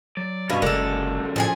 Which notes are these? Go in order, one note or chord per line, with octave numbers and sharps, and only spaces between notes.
F#3 D5
G2 B2 C#4 F5
F#1 F#2 D3 G#3 A4 A#4 D5
A2 F3 G#4 G#5